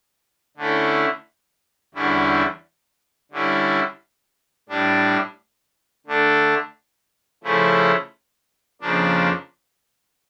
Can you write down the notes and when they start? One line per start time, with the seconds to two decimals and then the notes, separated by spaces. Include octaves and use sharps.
0.57 D3 A3 C#4 E4
1.94 E2 D3 G3 C#4 E4
3.32 D3 G3 C#4 E4
4.69 A2 G3 D4
6.07 D3 A3 D4
7.44 C#3 F3 A3 C#4 E4
8.81 F2 C#3 F3 A#3 D4